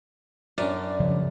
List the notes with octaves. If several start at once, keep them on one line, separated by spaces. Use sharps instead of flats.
F#2 C#4 D4 D5
G2 C#3 F3